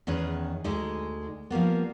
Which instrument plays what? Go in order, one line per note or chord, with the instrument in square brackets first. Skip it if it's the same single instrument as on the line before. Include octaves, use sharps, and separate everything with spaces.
[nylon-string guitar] E2 D#3 C#4 G#4 B4
D2 G#3 D#4
F3 G3 A#3 B3